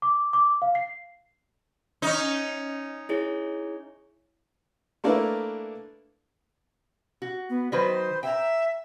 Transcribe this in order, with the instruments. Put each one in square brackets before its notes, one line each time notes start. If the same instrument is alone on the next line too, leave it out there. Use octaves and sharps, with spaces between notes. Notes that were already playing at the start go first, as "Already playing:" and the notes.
[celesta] D6
D6
F5
C7
[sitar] C#4 D#4
[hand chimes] E4 G#4 C#5
[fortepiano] A3 A#3 D4 E4 A#4 B4
[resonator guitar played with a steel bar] F#4
[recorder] B3
[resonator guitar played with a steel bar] D#3 F#3 B4 [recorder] C5
[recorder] E5 [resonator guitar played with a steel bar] G5 A#5